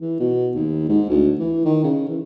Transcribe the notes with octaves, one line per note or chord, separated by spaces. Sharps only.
E3
B2
D#2
G#2
D2
E3
D#3
C#3
E3